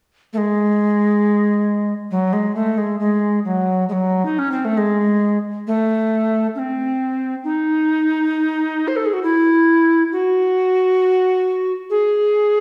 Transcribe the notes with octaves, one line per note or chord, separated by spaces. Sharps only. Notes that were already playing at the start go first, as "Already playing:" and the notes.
A3
G#3
F#3
G#3
A3
G#3
G#3
F#3
G#3
F#3
D#4
C#4
C4
A3
G#3
A3
C#4
C4
D#4
C5
A4
G#4
F#4
E4
F#4
G#4